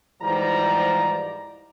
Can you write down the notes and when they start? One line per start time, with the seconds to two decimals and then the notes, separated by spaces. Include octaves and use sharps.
0.22 G#2 E3 F3 G3 D5 A#5